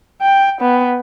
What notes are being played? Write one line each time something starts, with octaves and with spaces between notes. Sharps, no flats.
G5
B3